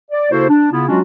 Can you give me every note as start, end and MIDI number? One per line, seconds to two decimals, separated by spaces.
0.11 0.29 74
0.31 0.46 49
0.31 0.46 58
0.31 0.46 64
0.31 0.46 66
0.31 0.46 69
0.31 0.46 72
0.48 0.68 62
0.72 0.86 49
0.72 0.86 59
0.72 0.86 64
0.72 0.86 65
0.88 1.00 54
0.88 1.00 56
0.88 1.00 61
0.88 1.00 62
0.88 1.00 65
0.88 1.00 66